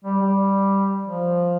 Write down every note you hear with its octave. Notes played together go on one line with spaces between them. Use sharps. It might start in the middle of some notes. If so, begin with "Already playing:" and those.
G3
G3
F3